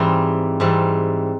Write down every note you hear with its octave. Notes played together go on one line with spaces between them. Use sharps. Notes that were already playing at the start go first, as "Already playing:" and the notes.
Already playing: G#2 E3 G3 C4
G#2 E3 G3 C4